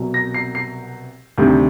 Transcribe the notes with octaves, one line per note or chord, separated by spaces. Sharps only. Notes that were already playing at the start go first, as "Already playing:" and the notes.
Already playing: C2 B2 F#3
A#6
C7
C7
D2 C3 D#3 G3